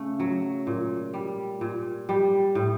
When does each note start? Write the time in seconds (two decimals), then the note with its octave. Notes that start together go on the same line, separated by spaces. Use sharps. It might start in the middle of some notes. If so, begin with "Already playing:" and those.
Already playing: C#3 A3
0.20 F#3
0.67 A#2
1.14 G3
1.61 A#2
2.09 G3
2.55 A2